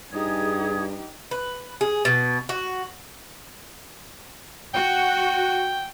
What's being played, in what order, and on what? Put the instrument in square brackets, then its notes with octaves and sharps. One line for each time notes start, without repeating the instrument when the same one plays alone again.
[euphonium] G2 [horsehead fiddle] D#4 G4 [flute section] G#4 D#6 G#6
[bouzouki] B4
G#4
B2
F#4
[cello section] F#4 [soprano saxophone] G5